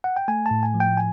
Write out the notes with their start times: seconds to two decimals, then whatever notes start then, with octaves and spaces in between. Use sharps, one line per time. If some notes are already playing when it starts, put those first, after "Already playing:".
0.04 F#5
0.16 G5
0.28 A3 G#5
0.46 A5
0.51 A2
0.63 G#5
0.74 F3
0.80 G5
0.97 G#5